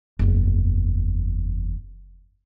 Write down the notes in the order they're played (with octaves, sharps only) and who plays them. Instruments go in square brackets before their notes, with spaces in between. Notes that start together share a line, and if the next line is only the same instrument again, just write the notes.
[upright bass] F#1 E2